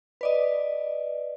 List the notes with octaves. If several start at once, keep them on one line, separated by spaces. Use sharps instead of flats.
B4 D5 D#5